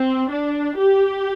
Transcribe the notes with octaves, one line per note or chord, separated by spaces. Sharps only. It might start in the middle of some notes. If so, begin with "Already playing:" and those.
Already playing: C4
D4
G4